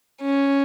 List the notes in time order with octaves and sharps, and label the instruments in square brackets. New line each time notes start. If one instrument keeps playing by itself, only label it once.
[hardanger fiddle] C#4